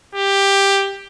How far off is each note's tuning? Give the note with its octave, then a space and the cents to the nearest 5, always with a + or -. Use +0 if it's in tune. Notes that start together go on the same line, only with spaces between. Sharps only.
G4 +10